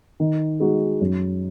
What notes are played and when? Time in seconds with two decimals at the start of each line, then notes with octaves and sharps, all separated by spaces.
0.20 D#3
0.60 G#3 D#4 F#4
1.01 F#2